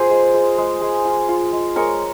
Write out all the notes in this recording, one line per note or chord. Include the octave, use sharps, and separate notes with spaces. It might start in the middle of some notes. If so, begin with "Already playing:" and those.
Already playing: F4 G#4 C5
G#3
G#3
G#3
G#3
F4
F4
G#3
G#3 A#4 C#5